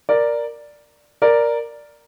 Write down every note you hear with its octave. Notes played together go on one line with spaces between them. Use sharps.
A#4 D5
A#4 D5